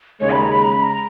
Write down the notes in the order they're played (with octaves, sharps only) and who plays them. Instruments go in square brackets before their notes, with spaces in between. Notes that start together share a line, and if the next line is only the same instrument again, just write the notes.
[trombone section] D#2 C#3 G#3 [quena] C#5
[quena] B5
A#5
B5
A#5
B5
A#5